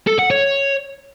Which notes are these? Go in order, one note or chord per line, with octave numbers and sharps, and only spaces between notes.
A4
F#5
C#5